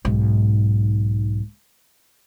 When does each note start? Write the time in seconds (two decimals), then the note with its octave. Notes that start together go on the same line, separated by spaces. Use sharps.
0.05 B1 G#2